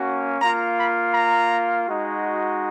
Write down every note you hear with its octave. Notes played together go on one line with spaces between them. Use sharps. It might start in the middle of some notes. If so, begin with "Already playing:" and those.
Already playing: A#3 C#4 F#4
A#3 F4 A#5
B5
A#5
G#3 D#4 F#4